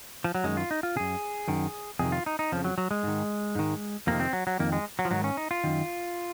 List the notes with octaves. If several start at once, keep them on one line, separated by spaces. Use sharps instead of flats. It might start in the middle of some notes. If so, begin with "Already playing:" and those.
F3
F#3
F#2 D#3 G#3
F4
D#4
F4
F#2 C#3 G#4
F#2 D#3
F2 C3 D#3 G#4
F4
D#4
D#4
F2 C#3 F3
F#3
F#3
G#3
G#2 D#3
G#2 D#3
F2 C3 D#3 A#3
C4
F#3
F#3
F2 D#3 A#3
G#3
F#3
F3
G#2 D#3 F#3
C#4
D#4
F4
F#2 D#3